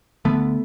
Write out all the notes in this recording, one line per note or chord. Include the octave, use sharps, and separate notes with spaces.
D2 D3 A3 B3